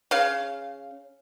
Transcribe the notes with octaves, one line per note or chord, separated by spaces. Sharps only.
C#3 F5